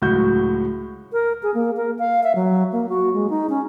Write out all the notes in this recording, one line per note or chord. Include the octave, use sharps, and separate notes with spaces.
C#2 A2 F#3 F#4 G6
A#4
G#4
A#3
A#4
F5
E5
F#3
A#3
F#4
G#3
D#4
C#4